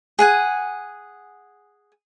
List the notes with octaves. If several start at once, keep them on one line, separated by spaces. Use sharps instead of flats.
G#4 F#5 G#5